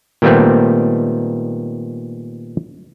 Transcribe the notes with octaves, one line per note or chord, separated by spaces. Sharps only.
A#2 D#3 G3 A3 B3 C4